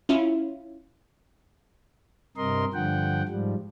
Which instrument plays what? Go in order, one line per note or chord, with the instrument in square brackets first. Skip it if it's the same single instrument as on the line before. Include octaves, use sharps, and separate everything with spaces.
[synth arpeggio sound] C#4 E4 F4
[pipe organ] G2 C3 A#4 D#5 C6
G2 D3 F3 F#5 G5
G#2 F3 G3